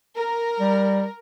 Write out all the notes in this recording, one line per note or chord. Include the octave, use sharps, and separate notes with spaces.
A#4
G3